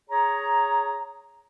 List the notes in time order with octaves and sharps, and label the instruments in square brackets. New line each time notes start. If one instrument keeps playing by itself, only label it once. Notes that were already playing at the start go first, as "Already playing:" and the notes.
[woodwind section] G#4 C#5 A#5